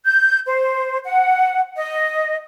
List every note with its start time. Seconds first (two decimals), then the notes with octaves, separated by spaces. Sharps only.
0.05 G6
0.46 C5
1.04 F#5
1.76 D#5